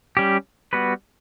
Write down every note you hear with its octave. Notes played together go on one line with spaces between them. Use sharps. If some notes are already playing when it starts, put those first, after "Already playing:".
G3 C#4 G4
G3 B3 F#4 B4